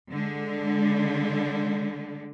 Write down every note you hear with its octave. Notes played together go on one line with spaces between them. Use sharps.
D3 G#3